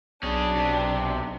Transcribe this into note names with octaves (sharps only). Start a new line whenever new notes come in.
B1 C#4 D4 G#4
C3